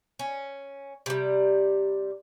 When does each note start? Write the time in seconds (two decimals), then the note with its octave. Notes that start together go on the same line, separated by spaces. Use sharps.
0.19 C#4
1.06 C3 G3